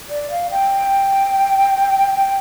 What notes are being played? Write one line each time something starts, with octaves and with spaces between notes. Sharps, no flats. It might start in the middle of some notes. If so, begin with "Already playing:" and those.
D5
F5
G5
G5